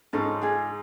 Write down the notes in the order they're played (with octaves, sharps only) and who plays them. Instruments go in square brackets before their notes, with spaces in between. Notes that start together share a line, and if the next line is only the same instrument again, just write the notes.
[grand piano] G#2 G#3 [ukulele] C#4 F4 A4
[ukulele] D4 F4 G#4